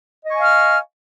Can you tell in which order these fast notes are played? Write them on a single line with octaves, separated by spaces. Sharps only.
D#5 C#6 G#5 F5 F6